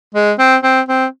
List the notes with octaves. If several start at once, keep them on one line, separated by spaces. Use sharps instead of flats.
G#3
C4
C4
C4